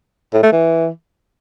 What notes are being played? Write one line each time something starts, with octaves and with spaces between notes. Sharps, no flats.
A2
A3
E3